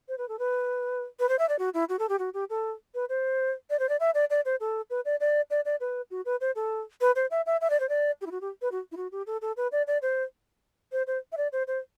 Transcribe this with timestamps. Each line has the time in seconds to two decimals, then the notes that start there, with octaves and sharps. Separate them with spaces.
0.08 C5
0.18 B4
0.28 A4
0.39 B4
1.19 B4
1.29 C5
1.39 E5
1.49 D5
1.59 F#4
1.74 E4
1.89 F#4
1.99 A4
2.09 G4
2.19 F#4
2.34 G4
2.50 A4
2.94 B4
3.09 C5
3.70 D5
3.79 C5
3.89 D5
4.00 E5
4.14 D5
4.30 D5
4.45 C5
4.60 A4
4.90 B4
5.05 D5
5.20 D5
5.50 D5
5.65 D5
5.80 B4
6.11 F#4
6.25 B4
6.41 C5
6.55 A4
7.01 B4
7.16 C5
7.31 E5
7.46 E5
7.61 E5
7.70 D5
7.80 C5
7.89 D5
8.21 G4
8.26 E4
8.31 F#4
8.41 G4
8.62 B4
8.72 F#4
8.92 E4
8.97 F#4
9.12 G4
9.27 A4
9.42 A4
9.57 B4
9.72 D5
9.87 D5
10.02 C5
10.92 C5
11.07 C5
11.32 E5
11.37 D5
11.52 C5
11.67 C5